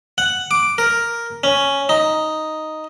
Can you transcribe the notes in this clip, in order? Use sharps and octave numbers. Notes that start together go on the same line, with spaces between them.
F#5
D6
A#4
C#4
D#4